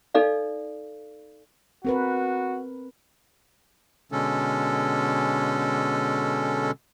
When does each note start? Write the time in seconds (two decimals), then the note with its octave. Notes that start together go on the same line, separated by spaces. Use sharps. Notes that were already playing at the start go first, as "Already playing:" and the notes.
0.15 D#4 A4 D5 F5
1.85 C4 F#4 A#4 B4
4.12 B2 D3 G#3 C#4 A4